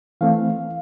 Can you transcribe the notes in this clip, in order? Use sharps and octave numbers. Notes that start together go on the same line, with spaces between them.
E3 A3 C4 F5